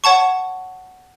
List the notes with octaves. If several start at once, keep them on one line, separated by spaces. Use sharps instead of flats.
C#5 F#5 A5 C#6